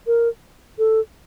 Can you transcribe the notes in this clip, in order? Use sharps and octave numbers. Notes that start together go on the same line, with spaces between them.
A#4
A4